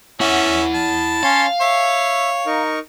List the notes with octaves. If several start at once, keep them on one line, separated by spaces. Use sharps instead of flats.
C#4 E4 E5 F#5
A5
C#4 C#5 F5 C6
C#5 E5
D#4 A#4 C#6